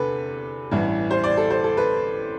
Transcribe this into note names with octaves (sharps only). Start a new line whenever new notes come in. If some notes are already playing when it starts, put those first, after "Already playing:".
Already playing: E2 C3 D4 A4 B4
A1 G2 E3
C5
D5
A4
C5
A4
B4